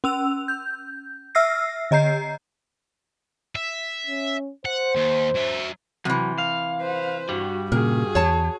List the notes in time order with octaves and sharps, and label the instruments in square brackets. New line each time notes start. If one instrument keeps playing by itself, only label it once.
[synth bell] C#4 E6 F7
G6
E5 E6 F6 A#6 C7
D3 D#5 A#5 G6 C7
[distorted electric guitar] E5
[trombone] C#4
[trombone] C5 [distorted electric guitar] F#5
[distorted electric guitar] D#2
F#3 E5
[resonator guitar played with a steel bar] C3 E3 [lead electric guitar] F#3
[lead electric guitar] F5
[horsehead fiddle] B4 C5
[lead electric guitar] G2 G3 [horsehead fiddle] F#4
[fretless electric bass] A#2 C#3 [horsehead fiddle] F#4 G#4 [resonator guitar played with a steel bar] A#4
[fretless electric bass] E2 [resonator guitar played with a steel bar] C#5 A5